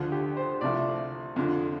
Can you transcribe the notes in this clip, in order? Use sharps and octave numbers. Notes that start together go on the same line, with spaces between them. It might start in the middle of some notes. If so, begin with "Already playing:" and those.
Already playing: D2 D3 F3 F4
G4
C5
C2 C3 F3 A3 D5
F2 D3 F3